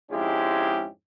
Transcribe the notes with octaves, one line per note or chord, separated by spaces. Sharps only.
F2 G#2 G#3 C#4 E4 G4